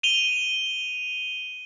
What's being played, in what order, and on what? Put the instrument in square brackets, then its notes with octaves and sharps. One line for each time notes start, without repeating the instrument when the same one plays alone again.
[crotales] D#7 F7 G7